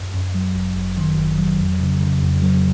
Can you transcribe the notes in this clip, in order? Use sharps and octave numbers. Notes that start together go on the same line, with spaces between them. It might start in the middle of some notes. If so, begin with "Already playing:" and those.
Already playing: F#2
F#2
F#3
G1
G1
D#3
G1
F#3
F2
C#3
C#3
F2
F#3